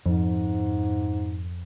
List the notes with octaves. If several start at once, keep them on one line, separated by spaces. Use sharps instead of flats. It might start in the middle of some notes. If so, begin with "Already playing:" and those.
F2 G#2